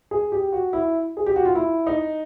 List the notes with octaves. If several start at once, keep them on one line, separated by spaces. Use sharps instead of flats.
G#4
G4
F#4
E4
G#4
G4
F#4
F4
E4
D#4